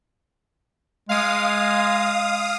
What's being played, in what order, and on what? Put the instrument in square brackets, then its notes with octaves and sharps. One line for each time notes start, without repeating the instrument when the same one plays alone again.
[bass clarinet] G#3 [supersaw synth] F5 D#6